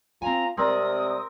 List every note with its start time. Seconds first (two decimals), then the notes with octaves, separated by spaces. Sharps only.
0.22 C4 F4 G#5 A#5
0.57 C3 G#3 C4 A#4 D5 D#6